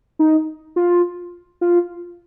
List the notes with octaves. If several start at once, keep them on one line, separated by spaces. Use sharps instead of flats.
D#4
F4
F4